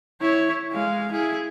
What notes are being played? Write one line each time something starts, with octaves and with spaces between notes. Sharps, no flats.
E4 C#5
G#3 F5
E4 G#4